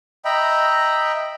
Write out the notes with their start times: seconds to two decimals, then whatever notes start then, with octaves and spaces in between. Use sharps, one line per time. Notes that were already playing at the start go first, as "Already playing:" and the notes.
0.25 D#5 E5 G5 A#5 B5